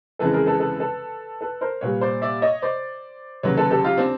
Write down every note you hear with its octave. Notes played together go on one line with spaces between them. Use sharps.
F2 C#3 E3 G#3 A4 B4
G#4 A#4
A4 B4
A4 B4
A4 B4
A4 B4
A#4 C5
A#2 G3 B4 C#5
C5 D5
D5 E5
C#5 D#5
C5 D5
D#2 C#3 F#3 B4 C#5
A4 B4
G4 A4
F4 G4
C4 D4